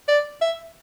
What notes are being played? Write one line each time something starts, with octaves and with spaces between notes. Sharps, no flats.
D5
E5